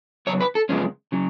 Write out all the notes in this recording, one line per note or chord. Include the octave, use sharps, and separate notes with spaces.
C#3 F#3 B3 C#5
B4
A4
F#2 C#3 F3 G#3 B3 C#4
C#3 F#3